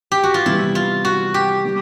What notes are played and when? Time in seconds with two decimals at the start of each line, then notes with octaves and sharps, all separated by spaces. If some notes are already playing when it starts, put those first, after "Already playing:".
0.12 G4
0.23 F#4
0.34 F4
0.46 C3 E3 G3 B3 E4
0.75 F4
1.05 F#4
1.34 G4
1.65 G3 B3